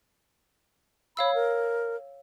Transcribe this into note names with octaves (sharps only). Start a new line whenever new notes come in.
C#5 F5 B5 E6
A#4